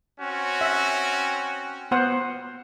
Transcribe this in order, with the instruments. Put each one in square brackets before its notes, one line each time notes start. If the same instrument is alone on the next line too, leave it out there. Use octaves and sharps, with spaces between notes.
[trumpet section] C4 C#4 F#4
[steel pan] E5
B3 C5 F#5